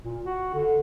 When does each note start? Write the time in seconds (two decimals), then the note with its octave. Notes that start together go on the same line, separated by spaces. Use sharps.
0.04 A#2
0.26 F#4
0.54 D3